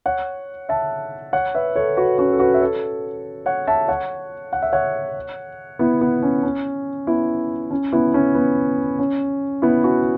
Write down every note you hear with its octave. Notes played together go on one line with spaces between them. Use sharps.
C#5 F#5
E5 A5
C#5 F#5
B4 E5
A4 C#5
F#4 B4
C#4 F#4
A4
F#4 B4
E5
A4 C#5
C#5 F#5
E5 A5
C#5 F#5
F#5
E5
C#5 F#5
B3 E4
B3
C#4
C#4
B3 E4
C#4
B3 E4
C#4
B3
C#4
B3 E4
C#4 F#4